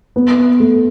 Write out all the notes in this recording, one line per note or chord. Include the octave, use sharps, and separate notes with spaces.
B3
A3